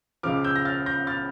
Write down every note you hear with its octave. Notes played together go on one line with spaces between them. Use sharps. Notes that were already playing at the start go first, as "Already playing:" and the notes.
C#2 C#3 F3 D6 F6
E6 G6
A#6
F6 A6
G6 A#6
F6 A6